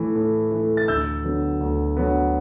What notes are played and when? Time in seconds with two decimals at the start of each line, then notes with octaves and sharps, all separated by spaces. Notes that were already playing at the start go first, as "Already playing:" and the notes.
Already playing: A2 E3 A3
0.15 A2
0.51 E3 A3
0.77 A6
0.88 D2 E6 G6
1.24 D3 F#3 B3
1.60 D2
1.97 D3 F#3 B3